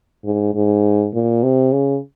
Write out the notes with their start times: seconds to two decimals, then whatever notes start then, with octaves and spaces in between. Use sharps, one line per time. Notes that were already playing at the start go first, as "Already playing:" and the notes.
0.25 G#2
0.54 G#2
1.13 A#2
1.43 C3
1.72 C#3